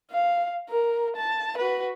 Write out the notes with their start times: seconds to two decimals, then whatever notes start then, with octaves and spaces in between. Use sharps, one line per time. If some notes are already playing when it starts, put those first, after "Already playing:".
0.11 F5
0.69 A#4
1.16 A5
1.57 F#4 B4